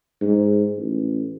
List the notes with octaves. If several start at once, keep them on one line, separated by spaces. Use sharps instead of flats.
G#2
A1